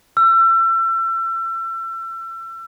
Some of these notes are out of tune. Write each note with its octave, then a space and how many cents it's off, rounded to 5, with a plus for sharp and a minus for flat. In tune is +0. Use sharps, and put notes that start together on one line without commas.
E6 +35